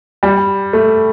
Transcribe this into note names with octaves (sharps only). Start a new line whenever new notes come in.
G3
A3